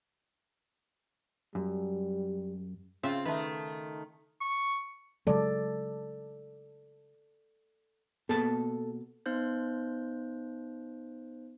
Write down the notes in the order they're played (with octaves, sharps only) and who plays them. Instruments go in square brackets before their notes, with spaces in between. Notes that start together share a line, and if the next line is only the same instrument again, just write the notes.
[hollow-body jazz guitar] F#2 [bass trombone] G3
[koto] C#3 E5 [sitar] C4 F4
[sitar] D#3 A3 [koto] B4
[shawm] C#6
[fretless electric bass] C#3 F#3 G#3 [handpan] A4 D5
[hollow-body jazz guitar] B2 A#3 A5 [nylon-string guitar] A4
[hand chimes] B3 D#4 C5 G6